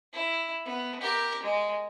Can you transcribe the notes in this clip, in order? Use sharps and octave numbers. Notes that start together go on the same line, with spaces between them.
E4
B3
G4 A#4
G#3